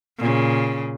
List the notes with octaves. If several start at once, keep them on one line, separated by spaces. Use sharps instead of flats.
A#2 C#3